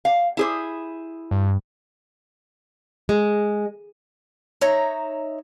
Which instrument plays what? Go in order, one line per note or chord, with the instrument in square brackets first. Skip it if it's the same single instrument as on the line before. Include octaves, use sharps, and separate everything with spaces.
[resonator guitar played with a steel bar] F5
E4 G#4 C5
[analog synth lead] G2
[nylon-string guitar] G#3
[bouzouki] D#4 C#5 E5 A#5